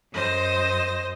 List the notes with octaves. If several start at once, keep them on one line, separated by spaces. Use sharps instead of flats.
F#2 C5 D#5 A#6